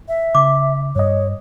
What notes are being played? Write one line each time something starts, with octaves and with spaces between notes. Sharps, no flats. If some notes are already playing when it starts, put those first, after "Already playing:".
E5
C#3 D6
G2 C#5 D#5